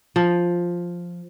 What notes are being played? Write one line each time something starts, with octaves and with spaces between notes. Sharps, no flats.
F3